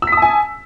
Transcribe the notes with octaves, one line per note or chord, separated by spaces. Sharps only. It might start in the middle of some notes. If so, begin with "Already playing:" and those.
G#5 A5 D#6 E6 B6